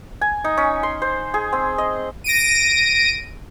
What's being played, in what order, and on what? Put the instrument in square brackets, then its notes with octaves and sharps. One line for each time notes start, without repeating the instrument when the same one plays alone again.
[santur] G#5
D#4
C#4
C6
C5
G#4
C4
D#5
[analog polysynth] A#6 D7 D#7